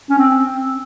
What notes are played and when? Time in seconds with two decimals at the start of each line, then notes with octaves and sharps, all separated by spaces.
0.10 C#4
0.18 C4